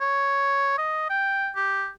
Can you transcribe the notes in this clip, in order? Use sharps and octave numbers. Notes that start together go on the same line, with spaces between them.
C#5
D#5
G5
G4